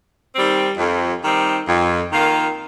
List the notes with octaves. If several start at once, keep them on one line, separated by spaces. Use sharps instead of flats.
D#3 G3 C4
F2
D#3 G3 C4
F2
D#3 A#3 F4